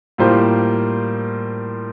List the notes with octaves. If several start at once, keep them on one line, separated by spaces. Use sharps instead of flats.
A2 G3 A#3 F4 C5